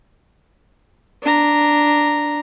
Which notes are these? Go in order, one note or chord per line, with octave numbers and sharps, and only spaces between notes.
D4 A#5